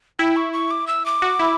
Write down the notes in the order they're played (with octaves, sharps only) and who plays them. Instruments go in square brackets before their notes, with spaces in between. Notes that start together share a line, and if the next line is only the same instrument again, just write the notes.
[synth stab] E4 [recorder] G5
[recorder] C#6
C#6
D6
E6
D6
[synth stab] F#4
E4